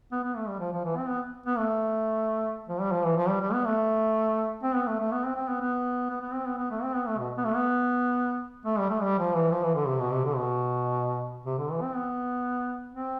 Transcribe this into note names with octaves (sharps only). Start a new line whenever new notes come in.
B3
B3
A3
G3
F3
F3
E3
C4
B3
B3
A3
F3
G3
F3
E3
F3
G3
G3
B3
A3
C4
B3
A3
A3
B3
C4
C4
B3
B3
B3
B3
C4
B3
B3
A3
C4
B3
A3
B2
B3
A3
B3
A3
G3
A3
G3
F3
E3
F3
E3
D3
C3
B2
C3
D3
B2
C3
D3
E3
C4
B3
C4